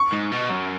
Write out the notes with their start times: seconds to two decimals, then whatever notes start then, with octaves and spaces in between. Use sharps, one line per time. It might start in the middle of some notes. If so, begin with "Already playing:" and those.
Already playing: C#6
0.12 G#2
0.32 B2
0.50 F#2